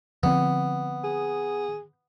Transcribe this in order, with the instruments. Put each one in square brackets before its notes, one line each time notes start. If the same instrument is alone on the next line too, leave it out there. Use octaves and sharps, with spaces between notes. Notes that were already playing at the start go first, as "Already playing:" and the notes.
[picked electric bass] D3 F3 C4 [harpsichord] B3
[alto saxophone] G#4